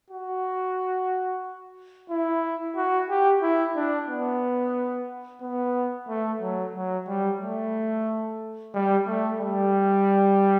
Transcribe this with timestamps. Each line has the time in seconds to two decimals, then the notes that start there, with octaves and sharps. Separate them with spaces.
0.11 F#4
2.10 E4
2.76 F#4
3.10 G4
3.42 E4
3.76 D4
4.09 B3
5.42 B3
6.09 A3
6.41 F#3
6.75 F#3
7.08 G3
7.41 A3
8.74 G3
9.07 A3
9.40 G3